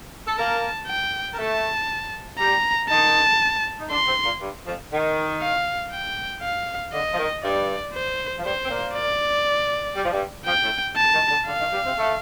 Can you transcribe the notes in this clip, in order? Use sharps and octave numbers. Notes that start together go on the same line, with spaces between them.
A4
A#3 A#4 A5
G5
A#4
A3 A4 A5
G3 G4 A#5
D#3 D#4 A5
D#4
D3 D4 C6
C3 C4
A#2 A#3
G2 G3
F2 F3
D#3
F5
G5
F5
D3 D#5
F3
D#3
G2 G3 D5
C5
F3
G2 G3 C5
C4
A#2 A#3
D5
G3
F3
G2 G3
F2 F3 G5
A2 A3
A5
D#3
D3
D3 F5
D#3
G2 G3
C3 C4
A3 A4